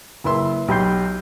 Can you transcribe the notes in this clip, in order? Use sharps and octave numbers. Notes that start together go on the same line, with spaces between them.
F#1 E4 B4 E5 C6
B1 G4 B5 C6 G6 C7